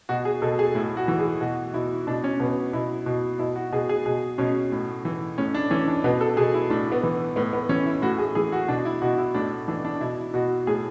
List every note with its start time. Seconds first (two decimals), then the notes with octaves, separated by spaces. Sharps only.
0.09 B2 F#4
0.25 G#4
0.42 B2 A4
0.59 G#4
0.75 A2 E4
0.97 F#4
1.08 E3
1.19 G#4
1.41 B2 F#4
1.74 B2 E4
2.07 B2 D4
2.24 C#4
2.40 B2 B3
2.73 B2 E4
3.06 B2
3.39 B2 E4
3.56 F#4
3.72 B2 G#4
3.89 G#4
4.06 B2 G#4
4.38 B2 C#4
4.72 A2
5.05 E3
5.38 A2 C#4
5.54 D4
5.71 E3 C#4
5.88 D4
6.04 B2 B3
6.21 A4
6.37 B2 G#4
6.54 E4
6.70 A2 D4
6.92 B3
7.03 E3
7.36 A2 B3
7.53 B3
7.69 E3 C#4
7.86 E4
8.02 A2 F#4
8.18 G#4
8.35 E3 G#4
8.52 F#4
8.68 B2 D4
8.85 E4
9.01 B2 F#4
9.18 E4
9.34 A2 D4
9.68 E3 D4
9.85 D4
10.01 B2 E4
10.34 B2 F#4
10.67 A2 G#4